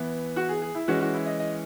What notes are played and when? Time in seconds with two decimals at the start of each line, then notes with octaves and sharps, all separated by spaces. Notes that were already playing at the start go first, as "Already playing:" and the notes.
Already playing: E3 B3 E4
0.36 F#4
0.49 G#4
0.62 G#4
0.75 E4
0.88 E3 G#3 C#4 F#4
1.01 F#4
1.14 E4
1.26 D#5
1.40 D#5